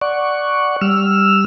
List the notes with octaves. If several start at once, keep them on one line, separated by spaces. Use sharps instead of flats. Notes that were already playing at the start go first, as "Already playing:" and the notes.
D5 F#5 C#6
G3 E6 F6